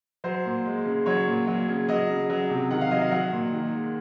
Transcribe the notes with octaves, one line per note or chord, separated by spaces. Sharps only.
F#3 C5
A#2
G#3
C#3
F#3 C#5
A#2
F#3
C#3
F#3 D#5
C#3
F#3
C3
D#3 F#5
F5
F#3 D#5
F5
F#3 F#5
A#2
D#3
G#3